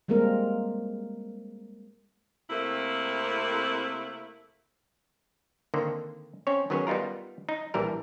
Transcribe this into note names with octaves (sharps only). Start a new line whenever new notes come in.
G3 G#3 A#3 C4 A#4
C3 A3 A#3 C4 E4
D3 D#3 A#3 C4
C4 C#4 C#5
D#3 F#3 B3 C#4 G#4 C#5
G3 B3 D#4 F4 A#4
D#4
A#1 E3 G3 A#4